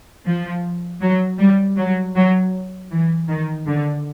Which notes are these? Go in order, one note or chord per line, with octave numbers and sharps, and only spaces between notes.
F3
F#3
G3
F#3
F#3
E3
D#3
D3